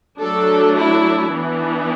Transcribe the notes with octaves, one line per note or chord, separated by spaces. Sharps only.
F#3 A3 D4 A4
E4
E3 B3 D4